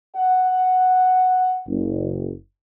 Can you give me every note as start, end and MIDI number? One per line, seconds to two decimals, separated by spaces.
0.15 1.60 78
1.67 2.31 30